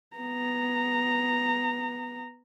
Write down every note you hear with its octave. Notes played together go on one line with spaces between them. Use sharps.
B3 A#5